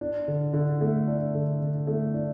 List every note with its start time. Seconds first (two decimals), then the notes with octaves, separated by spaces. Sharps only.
0.01 D4
0.28 D3
0.53 D3
0.81 A3
1.07 D4
1.35 D3
1.62 D3
1.87 A3
2.14 D4